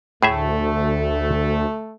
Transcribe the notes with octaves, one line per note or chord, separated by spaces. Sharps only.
D2 A2 A3 G#4 E5